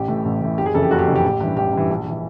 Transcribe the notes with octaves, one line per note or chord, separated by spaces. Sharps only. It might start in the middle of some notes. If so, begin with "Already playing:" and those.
Already playing: A1 G4
A2 E3
A1
A2 E3
F#1 G4
G#4
F2 C#3 E3 A4
G4
F#1 F#4
G4
F2 C#3 E3
G4
A1
G2 E3
A1 G4
G2 E3
A#1
E3